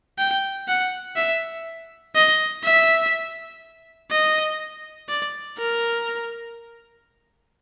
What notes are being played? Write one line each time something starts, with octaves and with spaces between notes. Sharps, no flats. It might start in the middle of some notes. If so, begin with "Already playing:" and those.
G5
F#5
E5
D#5
E5
D#5
D5
A#4